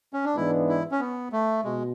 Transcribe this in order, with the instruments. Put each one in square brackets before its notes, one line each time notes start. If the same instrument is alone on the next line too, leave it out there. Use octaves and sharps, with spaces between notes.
[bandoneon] C#4
D4
[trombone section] G#2 E3 G#3 B3 D4 [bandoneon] E4
[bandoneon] E4
C#4
B3
A3
[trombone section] B2 [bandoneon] G#3